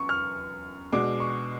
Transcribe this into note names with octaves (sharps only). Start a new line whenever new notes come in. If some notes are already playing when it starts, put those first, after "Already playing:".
Already playing: F#2 B3 C#6
F6
B2 G#3 D4 F#4 D6
C#6